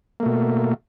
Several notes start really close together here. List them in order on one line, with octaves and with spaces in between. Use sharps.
A#3 A3 B2